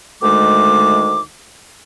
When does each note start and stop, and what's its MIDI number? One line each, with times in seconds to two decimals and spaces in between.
0.23 1.21 38
0.23 1.21 51
0.23 1.21 56
0.23 1.21 57
0.23 1.21 86